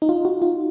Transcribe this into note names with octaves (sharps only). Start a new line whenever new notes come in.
D#4
F4
F#4
F4